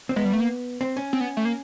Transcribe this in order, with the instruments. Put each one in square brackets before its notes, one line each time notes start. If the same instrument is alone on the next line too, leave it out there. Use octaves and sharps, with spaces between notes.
[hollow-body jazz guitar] C4
[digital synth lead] G#3 [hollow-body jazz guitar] B3
[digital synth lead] G3
A3
A#3
[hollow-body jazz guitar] C4
C#4
[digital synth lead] C4
B3
A3
A#3